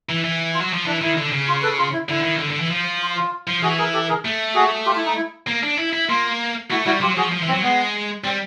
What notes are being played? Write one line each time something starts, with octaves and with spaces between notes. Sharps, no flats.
E3
E3
F4
F#3
F3
E3 D4
D#3 E4
D3
C#3
F4
A4 B4
F4
E4
D3 E4
D#3
D3
D3
E3
F3
F4
F4
F3
E3 F#4 G#4
G#4 A#4
G4 A4
G#4 A#4
A3
F#4 G#4
F4 G4
E4
D#4
E4
A#3
D4
E4
E4
A#3 F4
A3 E4 F#4
G3 E4 F#4
F#3 F4 G4
F3 F#4 G#4
F3
E3
C4
F#3
G#3 B3
G3 C4